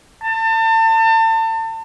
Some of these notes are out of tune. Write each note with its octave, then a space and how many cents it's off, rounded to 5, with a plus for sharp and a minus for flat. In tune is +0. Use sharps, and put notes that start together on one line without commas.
A5 +35